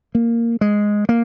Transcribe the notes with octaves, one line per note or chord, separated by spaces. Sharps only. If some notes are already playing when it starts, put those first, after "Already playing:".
A#3
G#3
A#3